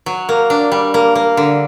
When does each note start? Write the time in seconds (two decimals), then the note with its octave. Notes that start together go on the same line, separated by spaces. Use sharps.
0.06 F#3
0.29 A#3
0.50 D4
0.72 G3
0.94 A#3
1.15 A#3
1.37 D3